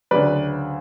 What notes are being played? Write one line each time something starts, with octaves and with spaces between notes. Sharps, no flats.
D2 C#3 F#3 B4 D5